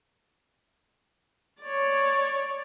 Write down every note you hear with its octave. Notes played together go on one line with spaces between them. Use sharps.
C#5 D5